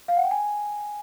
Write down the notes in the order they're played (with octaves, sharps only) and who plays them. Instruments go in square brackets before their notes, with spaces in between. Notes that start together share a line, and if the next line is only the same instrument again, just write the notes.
[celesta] F5
F#5
G5
G#5